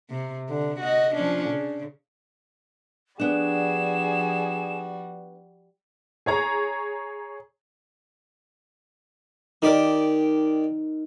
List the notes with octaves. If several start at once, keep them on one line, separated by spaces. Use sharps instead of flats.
C3
D3
F#4 D#5
F3 C#4 D4
C#3
F3 G3 B3 D4 F#4 G#4 E7
G#4 C#5 A#5
D#3 D#4 G4 A#4 D5